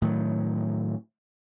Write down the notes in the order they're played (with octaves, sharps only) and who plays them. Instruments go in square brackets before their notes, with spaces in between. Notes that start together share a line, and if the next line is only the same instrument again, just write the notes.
[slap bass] A2 D#3 F#3